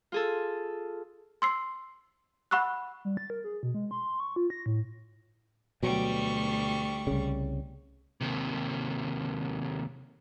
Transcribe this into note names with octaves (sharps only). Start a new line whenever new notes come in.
F4 G#4 A4
C6 E6 C7
F#5 B5 C#6 E6 F#6
G3
A6
A#4
G#4
B2
G#3
C6
C#6
F4
A#6
A2
D2 B2 F#3 G3 C#6
C2 C#3
D#2 C3